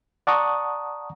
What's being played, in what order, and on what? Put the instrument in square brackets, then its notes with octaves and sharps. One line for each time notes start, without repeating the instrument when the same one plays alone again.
[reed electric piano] D5 F#5 A5 A#5 C#6 D#6